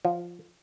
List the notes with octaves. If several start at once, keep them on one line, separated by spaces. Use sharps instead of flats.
F3